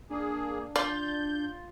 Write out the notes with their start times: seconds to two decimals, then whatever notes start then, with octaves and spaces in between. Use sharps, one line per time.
0.10 A#3 D4 G#4
0.76 F4 D5 G6